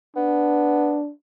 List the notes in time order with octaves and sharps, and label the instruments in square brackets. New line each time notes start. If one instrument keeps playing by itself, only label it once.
[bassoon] B3 [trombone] D4